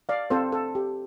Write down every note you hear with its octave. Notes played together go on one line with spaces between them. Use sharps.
D5 F5
C4 F4 A4 C5
A4
G4